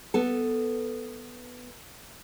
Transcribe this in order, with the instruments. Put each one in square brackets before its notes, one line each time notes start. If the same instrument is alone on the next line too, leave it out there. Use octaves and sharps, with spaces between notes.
[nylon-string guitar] B3 A4